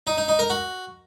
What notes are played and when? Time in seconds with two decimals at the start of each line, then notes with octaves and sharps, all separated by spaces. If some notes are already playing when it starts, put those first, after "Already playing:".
0.07 D#4
0.18 D#4
0.28 D#4
0.39 A#4
0.50 F#4